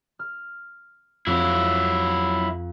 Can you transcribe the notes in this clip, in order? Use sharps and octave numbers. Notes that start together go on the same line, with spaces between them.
F6
F2 F#3 E4